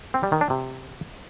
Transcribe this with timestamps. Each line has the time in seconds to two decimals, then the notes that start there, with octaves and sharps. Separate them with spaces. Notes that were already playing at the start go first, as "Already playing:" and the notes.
0.14 C4
0.23 G3
0.32 D#3
0.41 D4
0.50 C3